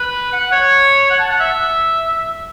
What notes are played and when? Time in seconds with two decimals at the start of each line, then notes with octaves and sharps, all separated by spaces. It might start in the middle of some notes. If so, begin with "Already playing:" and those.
Already playing: B4
0.32 F#5
0.52 C#5
1.10 F#5
1.19 A5
1.30 F#5
1.40 E5